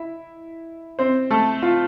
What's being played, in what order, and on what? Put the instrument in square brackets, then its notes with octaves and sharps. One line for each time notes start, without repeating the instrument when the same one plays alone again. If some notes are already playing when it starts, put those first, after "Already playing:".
Already playing: [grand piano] E4 E5
C4 C5
A3 A4
F4